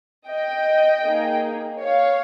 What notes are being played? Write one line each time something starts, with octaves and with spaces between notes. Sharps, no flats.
D#5 G5
A#3 D#4 G#4
C#5 F5